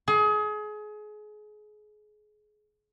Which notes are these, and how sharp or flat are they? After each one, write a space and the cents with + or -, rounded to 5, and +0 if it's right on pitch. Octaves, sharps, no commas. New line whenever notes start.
G#4 +30